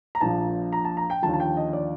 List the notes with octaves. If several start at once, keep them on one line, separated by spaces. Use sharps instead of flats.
A#5
A#1 A#2 F3 A5
A#5
A5
A#5
G5
D#2 D3 F3 A5
A5
G5
D#5
D5